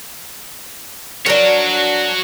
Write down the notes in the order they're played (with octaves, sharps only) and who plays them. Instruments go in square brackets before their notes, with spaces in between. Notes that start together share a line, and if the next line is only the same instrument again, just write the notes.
[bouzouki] D4 A#4 [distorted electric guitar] F#4 C#5